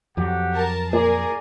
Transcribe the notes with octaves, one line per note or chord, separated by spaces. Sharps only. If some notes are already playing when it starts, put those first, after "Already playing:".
F2 F#3 G4 F#5
A#4 A5
A#2 G#4 A#4 D5 G#5 A#5